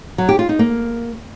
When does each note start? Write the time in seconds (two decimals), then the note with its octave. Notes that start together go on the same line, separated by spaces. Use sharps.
0.18 F#3
0.29 G4
0.39 F4
0.49 D#4
0.59 A#3